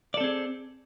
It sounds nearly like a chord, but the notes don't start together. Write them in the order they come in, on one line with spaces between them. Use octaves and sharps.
D5 A4 C4 G#4